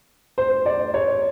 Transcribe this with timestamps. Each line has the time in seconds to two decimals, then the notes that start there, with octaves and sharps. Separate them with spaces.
0.38 C5
0.66 D5
0.94 C#5